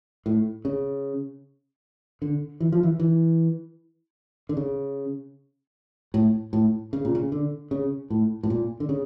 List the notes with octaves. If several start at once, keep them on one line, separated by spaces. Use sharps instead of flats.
A2
C#3
D3
E3
F3
E3
E3
D3
C#3
A2
A2
C#3
A#2
C#3
D3
C#3
A2
A2
A#2
D3
C#3